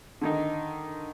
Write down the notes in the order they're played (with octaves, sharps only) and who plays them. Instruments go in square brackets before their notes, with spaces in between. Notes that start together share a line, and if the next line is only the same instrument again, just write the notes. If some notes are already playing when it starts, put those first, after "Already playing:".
[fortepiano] D3 D#3 D#4